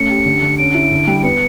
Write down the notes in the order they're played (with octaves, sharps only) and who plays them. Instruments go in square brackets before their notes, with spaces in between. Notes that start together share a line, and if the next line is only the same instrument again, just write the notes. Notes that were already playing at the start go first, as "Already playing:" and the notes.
Already playing: [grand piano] A3 C#4 [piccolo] C#7
[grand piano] G4
D3
D3
[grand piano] C#4 [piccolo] D7
[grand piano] E4
D3
G3
[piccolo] D7
[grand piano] B3 [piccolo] C#7